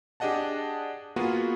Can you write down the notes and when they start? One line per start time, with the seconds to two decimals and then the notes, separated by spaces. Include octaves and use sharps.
0.20 D4 G4 G#4 D#5 F#5 A5
1.16 A#3 B3 F4 F#4 G#4